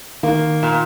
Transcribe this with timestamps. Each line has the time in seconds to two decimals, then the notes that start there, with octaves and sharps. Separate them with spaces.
0.23 D#3 A#3
0.63 A#2